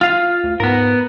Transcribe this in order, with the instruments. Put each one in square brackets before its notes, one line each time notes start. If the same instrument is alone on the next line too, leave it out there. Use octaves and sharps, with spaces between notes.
[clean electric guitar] F4 F5
[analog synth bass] D2
[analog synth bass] G#2 [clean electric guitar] B3 A#4